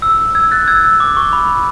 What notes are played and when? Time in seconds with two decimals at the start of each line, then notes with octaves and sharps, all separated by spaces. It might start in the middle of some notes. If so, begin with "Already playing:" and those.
0.02 E6
0.35 E6 G#6
0.51 F#6 A6
0.68 E6 G#6
0.84 E6
1.00 D6
1.17 C#6
1.33 B5